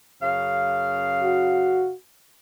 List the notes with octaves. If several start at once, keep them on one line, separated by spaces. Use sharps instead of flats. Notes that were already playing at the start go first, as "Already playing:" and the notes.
F#2 C#3 F5
F#4